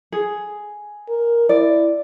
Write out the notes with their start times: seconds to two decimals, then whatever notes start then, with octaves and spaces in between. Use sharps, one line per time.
0.12 G#4
1.09 A#4
1.49 E4 D5